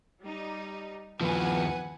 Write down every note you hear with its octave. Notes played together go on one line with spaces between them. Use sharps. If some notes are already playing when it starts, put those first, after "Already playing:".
G3 D#4
D#2 F3 B4 F#5 G#5